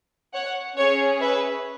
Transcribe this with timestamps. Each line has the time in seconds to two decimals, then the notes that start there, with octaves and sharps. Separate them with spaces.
0.34 C#5 F#5
0.77 C#4 G#4 C#5
1.21 B4 E5